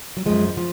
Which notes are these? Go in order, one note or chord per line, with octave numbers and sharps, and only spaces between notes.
F#3
F#2 F3 G#3
F3